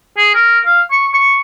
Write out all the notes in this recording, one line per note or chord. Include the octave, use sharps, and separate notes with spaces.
G#4
A#4
F5
C#6
C#6